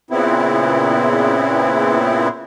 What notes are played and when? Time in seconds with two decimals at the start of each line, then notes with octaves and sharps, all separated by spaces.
0.11 A#2 C#3 B3 C4 E4